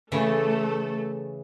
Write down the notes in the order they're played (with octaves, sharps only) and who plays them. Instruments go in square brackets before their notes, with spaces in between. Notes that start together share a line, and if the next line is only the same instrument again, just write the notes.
[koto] C#3 E3 [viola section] A3 A4